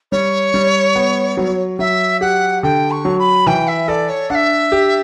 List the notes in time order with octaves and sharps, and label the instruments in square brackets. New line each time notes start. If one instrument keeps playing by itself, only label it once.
[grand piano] G3 [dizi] C#5
[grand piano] G3
B3
F#3
[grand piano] F#3 [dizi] E5
[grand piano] G4 [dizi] F#5
[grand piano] D3 [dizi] G5
[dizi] C#6
[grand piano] F#3
[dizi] B5
[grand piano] E3 [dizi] G5
[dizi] E5
[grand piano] A4 [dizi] D5
[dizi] C#5
[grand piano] D4 [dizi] E5 F#5
[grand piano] G4